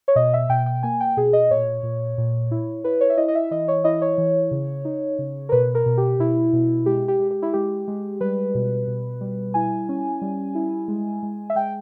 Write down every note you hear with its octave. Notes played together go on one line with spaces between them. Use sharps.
C#5
B2 D#5
E5
B2 G5
G5
A#3 G#5
G5
B2 G#4
D#5
A#2 C#5
A#2
A#2
E4
E4 B4
C#5
E5
E4 D#5
D#5
E5
E3 D#5
C#5
E4 D#5
C#5
E3
C#3
D#4
C#3
A#4
B2 B4
A#4
B2
G4
B2 E4
B2
G#3 G4
G4
G#3
G4
E4
G#3 G4
G#3
G3 B4
B2
B2
G3
E4 G#5
C#4
G3
E4
G#3
G#3
E5
G#3 G5